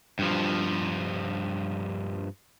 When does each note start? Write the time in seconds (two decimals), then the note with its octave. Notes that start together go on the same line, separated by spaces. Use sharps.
0.19 G2 F3